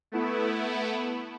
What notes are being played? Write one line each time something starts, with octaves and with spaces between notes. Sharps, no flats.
A3 B3 E4